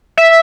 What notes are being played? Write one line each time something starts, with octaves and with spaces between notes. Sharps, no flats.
E5